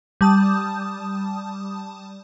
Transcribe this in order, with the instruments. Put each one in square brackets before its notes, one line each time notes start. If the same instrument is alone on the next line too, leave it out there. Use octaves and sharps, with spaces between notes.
[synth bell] G3 A5 D#6